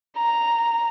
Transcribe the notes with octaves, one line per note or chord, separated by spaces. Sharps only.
A#5